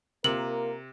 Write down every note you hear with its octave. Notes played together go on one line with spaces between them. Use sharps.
C3 A#3 F4 A#4 F#7